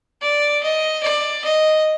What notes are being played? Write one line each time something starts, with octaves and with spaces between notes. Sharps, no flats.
D5
D#5
D5
D#5